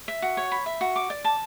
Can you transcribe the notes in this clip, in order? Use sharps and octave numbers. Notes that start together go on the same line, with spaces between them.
E5
F#4
C#5
B5
E5
F#4
D6
D5
A5